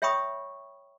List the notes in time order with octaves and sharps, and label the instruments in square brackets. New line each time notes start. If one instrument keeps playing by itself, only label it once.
[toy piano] C#5 E5 G5 B5 C#6 D#6